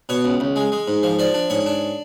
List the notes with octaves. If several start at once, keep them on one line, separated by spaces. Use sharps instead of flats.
B2 C#5
C#2
C#2
G#3
G#3
G#2
F3
F3 D5
D4
G#2 C#5
D4